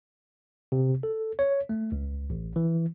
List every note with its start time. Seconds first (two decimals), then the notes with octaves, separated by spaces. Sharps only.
0.72 C3
1.03 A4
1.39 C#5
1.69 A3
1.92 C#2
2.30 A1
2.56 E3